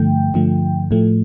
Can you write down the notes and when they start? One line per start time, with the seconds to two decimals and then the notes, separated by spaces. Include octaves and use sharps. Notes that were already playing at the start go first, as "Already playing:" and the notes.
Already playing: G2 D3 F3 A3 G5
0.34 G2 D3 F3 A3
0.91 A2 F3 A3